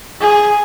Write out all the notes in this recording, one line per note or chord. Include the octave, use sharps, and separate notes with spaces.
G#4